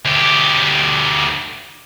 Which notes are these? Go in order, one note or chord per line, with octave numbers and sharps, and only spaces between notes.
D2 G4